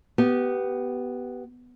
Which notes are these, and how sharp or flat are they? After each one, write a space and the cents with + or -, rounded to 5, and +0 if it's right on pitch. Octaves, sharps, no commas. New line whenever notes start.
B3 +0 G4 -20